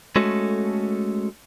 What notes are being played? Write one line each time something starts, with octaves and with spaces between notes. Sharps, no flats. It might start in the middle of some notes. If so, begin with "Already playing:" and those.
G#3 A3 C#4 F#4 A4